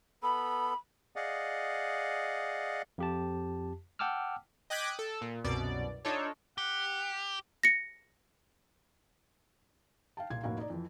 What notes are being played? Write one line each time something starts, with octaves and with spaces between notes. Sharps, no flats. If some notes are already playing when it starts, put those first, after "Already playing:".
B3 A4 B5
G#4 D5 D#5 F5 F#5
F2 G4 A5
F#5 G5 A5 D6 E6 F6
D#5 G5 D6 F#6 G#6 B6
A4
A#2
C2 F#2 B2 D5
D4 D#4 F4 A4 C#5
G4 F#5
A#6 C#7
F5 G5 A5
C2 A#2 F4 G#6
F1 A2 A#3 F#4 F5
D#4 D5
F2 E3